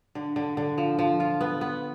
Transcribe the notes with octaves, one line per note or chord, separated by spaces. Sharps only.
D3
D3
D3
F3
F3
F4
B3
B3